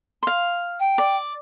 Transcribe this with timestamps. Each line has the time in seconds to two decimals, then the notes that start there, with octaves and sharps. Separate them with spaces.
0.23 F5 C6
0.80 G5
0.98 D5